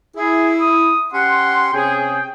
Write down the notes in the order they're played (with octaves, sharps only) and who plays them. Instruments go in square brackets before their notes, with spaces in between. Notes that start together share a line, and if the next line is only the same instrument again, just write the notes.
[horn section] E4 [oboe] G#4
[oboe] D#6
[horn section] C#4 G4 C6 [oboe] F#5
[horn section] C3 C#4 G#4 [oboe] G5